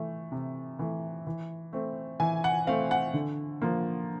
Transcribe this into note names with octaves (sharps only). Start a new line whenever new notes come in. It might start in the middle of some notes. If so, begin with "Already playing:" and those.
Already playing: E3 A3
C3
E3 A3
E3
A3 C4
E3 G#5
F#5
A3 C4 F5
F#5
D3
F3 A#3